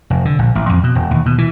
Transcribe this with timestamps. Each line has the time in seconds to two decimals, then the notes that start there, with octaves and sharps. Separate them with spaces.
0.10 F1
0.25 D3
0.39 A#1
0.55 A1
0.69 F2
0.83 B2
0.95 E1
1.11 D#2
1.26 B2
1.38 E3